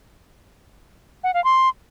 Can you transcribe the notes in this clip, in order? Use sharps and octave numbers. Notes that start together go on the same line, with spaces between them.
F#5
F5
C6